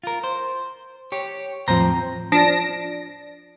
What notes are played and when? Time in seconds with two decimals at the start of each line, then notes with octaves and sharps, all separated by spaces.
0.04 F4 A#4
0.24 C5
1.12 G4 C#5
1.68 E2 A2 F3 C4 C5 A#5
2.32 F3 D4 A5 A#6 D7